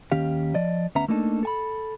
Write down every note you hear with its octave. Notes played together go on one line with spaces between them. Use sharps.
D#2 D#3 C#4 G4 F5
F3 D5 D#5
D2 B3 C#4 E5 A#5
A3 A#3 D4 D#4 G4 A4
A4 G#5 B5